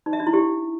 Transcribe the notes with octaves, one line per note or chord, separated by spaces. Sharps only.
D#4
E5
D4
E4
G4